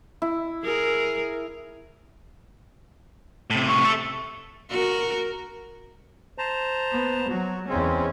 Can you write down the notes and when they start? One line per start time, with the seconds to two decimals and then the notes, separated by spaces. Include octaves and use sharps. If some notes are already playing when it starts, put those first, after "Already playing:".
0.22 E4
0.64 G#4 A#4
3.50 A2 C3
3.69 C#6
3.85 A4 E5
4.70 F#4 A#4
6.38 C5 A5 A#5
6.92 B3
7.30 F#3 F#4
7.69 E2 C#3 G#3 C4 C#4